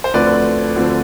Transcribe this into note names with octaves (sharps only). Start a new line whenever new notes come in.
C5
D2 D3 F3 A3 C4 B4 D5
D2 D3 F3 A3 C4